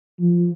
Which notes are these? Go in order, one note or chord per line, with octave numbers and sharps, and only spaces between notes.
F3